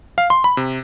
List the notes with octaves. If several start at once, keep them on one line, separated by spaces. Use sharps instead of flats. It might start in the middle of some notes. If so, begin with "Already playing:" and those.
F5
C6
B5
C3